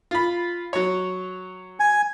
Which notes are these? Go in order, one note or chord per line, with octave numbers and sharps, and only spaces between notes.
F4 B5
F#3 C#5
G#5